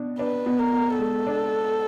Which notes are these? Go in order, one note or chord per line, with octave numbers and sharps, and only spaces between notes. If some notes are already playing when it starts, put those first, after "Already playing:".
Already playing: B2 D4
D4 B4
B2
A#4
B2
G#3 A4
D4